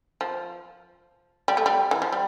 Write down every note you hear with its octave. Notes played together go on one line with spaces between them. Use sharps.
F3
G3
A3
G3
E3
F3
G3